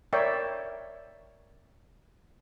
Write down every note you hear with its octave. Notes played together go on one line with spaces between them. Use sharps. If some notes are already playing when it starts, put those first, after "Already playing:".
A#4 C#5 D5 E5 G5